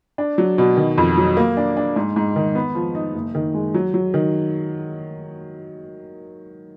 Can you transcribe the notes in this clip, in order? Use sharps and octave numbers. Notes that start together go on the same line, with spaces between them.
D4
F#3
B2
D#3
F2
F#3
A#3
D4
D4
G#2
G#2
D#3
B3
F3
D#4
F#1
D#3
G#3
F#3
F#3
D#3